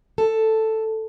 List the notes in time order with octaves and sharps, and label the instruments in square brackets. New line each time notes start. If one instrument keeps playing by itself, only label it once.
[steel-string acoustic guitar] A4